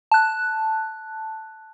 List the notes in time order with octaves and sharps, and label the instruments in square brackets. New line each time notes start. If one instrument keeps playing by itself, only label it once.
[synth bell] A5 F#6